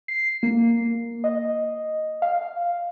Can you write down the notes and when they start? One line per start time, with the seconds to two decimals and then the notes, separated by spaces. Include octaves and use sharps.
0.08 C7
0.43 A#3
1.24 D#5
2.22 F5